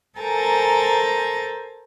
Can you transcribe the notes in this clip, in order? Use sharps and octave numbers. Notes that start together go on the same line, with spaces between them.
A4 A#4 C5 G#5 A#5 A6